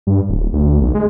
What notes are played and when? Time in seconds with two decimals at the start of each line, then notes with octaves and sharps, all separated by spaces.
0.07 G2
0.29 D1
0.53 D2
0.81 B1
0.95 G#3